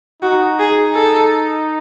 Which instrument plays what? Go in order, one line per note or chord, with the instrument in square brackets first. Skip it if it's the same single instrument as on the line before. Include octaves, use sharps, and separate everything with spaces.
[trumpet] D#4 [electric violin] F#4
[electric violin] G#4
A4